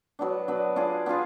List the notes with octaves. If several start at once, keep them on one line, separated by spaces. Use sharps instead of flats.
F#3 B3 D4
F#3 B3 D4
B3 D4 F4 G#4
B3 D4 F4 G#4